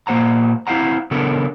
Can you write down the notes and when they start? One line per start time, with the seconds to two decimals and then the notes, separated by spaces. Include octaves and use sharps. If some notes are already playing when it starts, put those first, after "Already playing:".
0.07 A#2 A#3 C5 F#5 A#5
0.67 C4 E4 C5 F5 F#5 A#5
1.11 C#3 B3 D4 A4 A#4